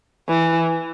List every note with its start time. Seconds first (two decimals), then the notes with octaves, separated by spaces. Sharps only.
0.28 E3